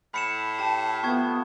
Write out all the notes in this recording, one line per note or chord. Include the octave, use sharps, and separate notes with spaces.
A2 B5 C#7 E7
G4 G5 A5
F3 A3 B3 B4 C#6 G#6